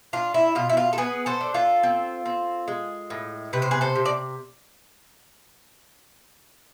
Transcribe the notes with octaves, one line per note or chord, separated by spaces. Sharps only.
D4 F4
E4
B2 F4
E4
F4
A4
B3 G#4 B4
A4 C5
D4
F4 A4
C4
C4
G#3
A2
C3 B4
C5
G#4 B4
A4 C5
C3
D5